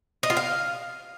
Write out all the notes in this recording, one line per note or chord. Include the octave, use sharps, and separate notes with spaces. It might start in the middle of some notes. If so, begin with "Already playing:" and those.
D#5
F4
F5